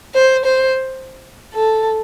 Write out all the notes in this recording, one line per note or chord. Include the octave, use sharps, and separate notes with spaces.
C5
C5
A4